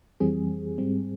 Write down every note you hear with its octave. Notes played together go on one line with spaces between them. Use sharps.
F2 E3 G3 C4 G#4
G#2 G3 C4